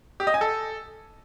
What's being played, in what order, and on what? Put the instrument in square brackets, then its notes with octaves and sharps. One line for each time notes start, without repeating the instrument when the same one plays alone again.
[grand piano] G4
D#5
G#5
A4